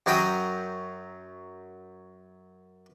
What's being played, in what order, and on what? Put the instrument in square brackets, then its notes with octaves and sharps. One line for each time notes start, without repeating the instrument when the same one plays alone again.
[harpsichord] F#2 F#3 G5 A#5 D#6